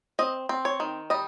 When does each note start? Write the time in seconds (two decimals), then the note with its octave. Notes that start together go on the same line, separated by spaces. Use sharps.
0.19 C4 D#5
0.49 C4
0.65 C#5
0.80 D#3
1.10 G3 D#5